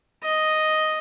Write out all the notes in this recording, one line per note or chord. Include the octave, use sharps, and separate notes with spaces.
D#5